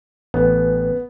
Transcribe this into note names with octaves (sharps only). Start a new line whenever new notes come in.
A1 B3